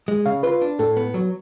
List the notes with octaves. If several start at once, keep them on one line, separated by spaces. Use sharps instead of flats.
G#3
C#3 F5
F4 B4
D4
A2 A4
B3
F#3